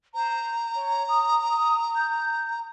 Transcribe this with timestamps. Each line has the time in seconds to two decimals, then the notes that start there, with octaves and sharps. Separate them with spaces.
0.14 C5 A#5
0.75 C#5
1.08 D#6
1.42 D#6
1.96 G6